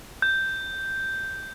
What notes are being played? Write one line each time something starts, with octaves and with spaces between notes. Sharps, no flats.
G6